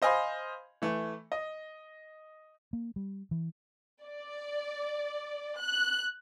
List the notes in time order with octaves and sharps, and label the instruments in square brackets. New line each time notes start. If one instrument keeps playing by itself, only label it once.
[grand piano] C5 D#5 F5 G#5 B5 C6
E3 A3
D#5
[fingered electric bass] A#3
G3
E3
[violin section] D5
F#6